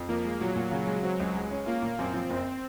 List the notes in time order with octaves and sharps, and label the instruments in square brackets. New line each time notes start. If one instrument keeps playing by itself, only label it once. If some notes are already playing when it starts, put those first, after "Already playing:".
Already playing: [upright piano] F2
[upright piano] F3 [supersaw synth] A#3
[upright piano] G#3
[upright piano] A#2 [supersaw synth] F#3
[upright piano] A#2
C#3
G#3
[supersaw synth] F#3 [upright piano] C4
[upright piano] C#2
G#3
C#4
[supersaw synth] A#3 [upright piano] F4
[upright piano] A#2
[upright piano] F#2 [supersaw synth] C4
[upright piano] F3
F#1